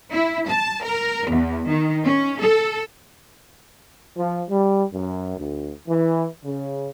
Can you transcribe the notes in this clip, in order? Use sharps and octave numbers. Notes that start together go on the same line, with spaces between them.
E4
A5
A#4
E2
D#3
C#4
A4
F3
G3
F#2
D2
E3
C#3